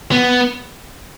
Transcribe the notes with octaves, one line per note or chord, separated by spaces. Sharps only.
B3